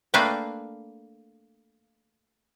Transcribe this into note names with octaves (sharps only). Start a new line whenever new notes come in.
A3 A#3 D4 B4 F5 G5